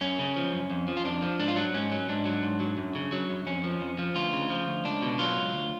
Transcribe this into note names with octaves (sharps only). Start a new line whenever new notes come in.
F#2 C#4
C#3
F3
F#2
F2
F3
F4
F2 D4
F3
G#2 D4
F4
F#3 D4
G#2 C#4
F#3
G#2 D4
F#3
G#2
F#3
F#2
C#3
F#3
F#2
F2 C#4
F3
F2
F3
D2 F4
C#3
F3
D2
C#2 D4
B2
F#3 F4
C#2
D2